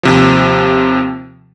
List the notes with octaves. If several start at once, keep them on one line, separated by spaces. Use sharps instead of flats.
D#2 C3 F3